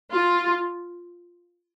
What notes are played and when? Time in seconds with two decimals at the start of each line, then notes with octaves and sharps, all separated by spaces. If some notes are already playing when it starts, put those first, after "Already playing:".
0.12 F4